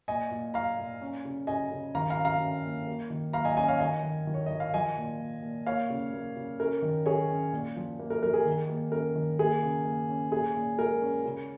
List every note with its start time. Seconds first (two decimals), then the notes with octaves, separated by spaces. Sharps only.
0.08 A#2 D#5 G#5
0.31 A#2
0.54 A#2 F5 A#5
0.78 A#2
1.01 C#4
1.25 C#3
1.47 C#3 D#5 G#5
1.71 C#3
1.95 D#3 F5 A#5
2.10 F5 A#5
2.18 C#4
2.25 F5 A#5
2.41 C#4
2.65 A#3
2.87 A#3
3.10 D#3
3.33 A#3 F5 A#5
3.45 D#5 G#5
3.57 C#4 D#5 G#5
3.68 C#5 F5
3.80 D#3 D#5 G#5
4.03 D#3
4.27 D#3
4.34 C#5
4.46 D#3 D#5
4.60 F5
4.74 F3 D#5 G#5
4.97 A#2
5.19 A#2
5.43 A#2
5.66 A#3 C#5 F5
5.90 C#3
6.13 A#3
6.37 C#3
6.60 C#4 A#4
6.82 D#3
7.06 C#4 G#4 C#5
7.30 C#4
7.52 A#2
7.77 F3
8.00 A#3
8.10 A#4
8.23 F3 A#4
8.34 G#4
8.45 D#3
8.69 A#3
8.92 C#4 A#4
9.15 D#3
9.39 A#3 G#4
9.63 C#3
9.85 A#3
10.09 C#4
10.32 A#2 G#4
10.56 A#2
10.78 G#3 A#4
11.02 C#4
11.25 C#3